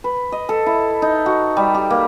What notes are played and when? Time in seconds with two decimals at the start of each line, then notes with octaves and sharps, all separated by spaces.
0.04 B4
0.32 D#5
0.49 A4
0.66 E4
1.02 D#4
1.26 F#4
1.57 G3
1.74 G4
1.90 A#3